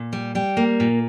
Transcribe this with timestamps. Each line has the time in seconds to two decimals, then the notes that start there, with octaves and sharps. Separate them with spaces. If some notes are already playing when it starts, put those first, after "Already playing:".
Already playing: A#2
0.13 G3
0.35 G3 G5
0.57 A#3
0.80 A#2